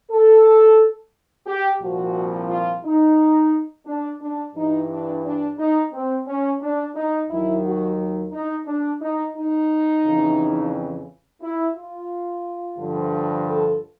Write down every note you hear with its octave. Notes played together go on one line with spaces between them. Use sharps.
A4
G4
C2 A#2 F3 F#4
F4
D#4
D4
D4
G2 E3 D#4
D4
D4
D#4
C4
C#4
D4
D#4
D#2 D#3 F#3 E4
F#4
D#4
D4
D#4
D#4
F2 C#3 E3
E4
F4
G2 D3 F3
A4